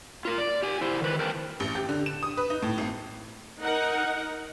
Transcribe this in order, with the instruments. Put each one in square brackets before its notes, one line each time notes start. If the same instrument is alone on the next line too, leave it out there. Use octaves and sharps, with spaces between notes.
[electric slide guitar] F4 A#4
D5
G4 G#5
E4 C5
D#3 B4
A#4 C5 G5 A5
[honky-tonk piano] A1
G4
D3
E7
D#6
B4
D#4
A2
G#1
[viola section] D#4 A#4 F#5